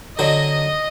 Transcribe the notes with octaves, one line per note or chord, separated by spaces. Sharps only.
D3 F#3 D#5